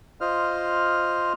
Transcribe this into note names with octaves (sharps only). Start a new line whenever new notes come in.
F4 C5 D#5 F6